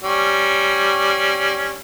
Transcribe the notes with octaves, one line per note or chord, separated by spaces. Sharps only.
G3 C#4